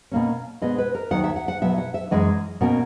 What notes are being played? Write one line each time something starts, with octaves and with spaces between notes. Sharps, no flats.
B2 A#3 C#4
B2 G#3 B3 D#5
B4
A#4
D#2 D#3 F#3 F#5
E5
F#5
F#5
B2 F#3 B3 E5
F#5
E5
F#2 E3 G#3 C#4 D#5
B2 A#3 C#4 A#4